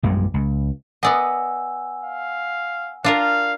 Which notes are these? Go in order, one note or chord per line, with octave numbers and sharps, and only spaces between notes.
A#1 F#2 G3 G#3
C#2
B3 D5 D#5 F#5 G#5 E6
F5
D4 F4 A#4 F5